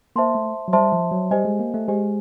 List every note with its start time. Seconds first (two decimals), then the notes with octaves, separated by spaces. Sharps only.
0.16 A#3 C5 E5 A5 C6
0.35 A3
0.68 F#3
0.73 G3 C5 E5 A5 C6
0.92 F3
1.11 F#3
1.31 G3 G4 C5 D#5 G#5
1.45 G#3
1.60 A#3
1.74 A3
1.88 G#3 G4 C5 D#5 G#5